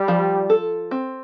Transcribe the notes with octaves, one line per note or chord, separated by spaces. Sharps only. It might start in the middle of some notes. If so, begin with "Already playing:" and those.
Already playing: G3
F3
A4
C4